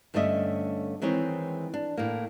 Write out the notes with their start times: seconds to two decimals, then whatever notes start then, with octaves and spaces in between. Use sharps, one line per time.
0.14 G2 D3 A3 C#4 D#5 E5
1.02 D#3 E3 G#3 C4 C#5
1.74 D4
1.97 A2 A#3